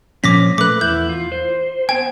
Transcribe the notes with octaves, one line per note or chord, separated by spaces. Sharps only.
A#2 F3 C#4 D6 A#6 B6
A3 B4 D6 F#6
E2 E4 G6
F4
C5
B3 C5 G5 G#5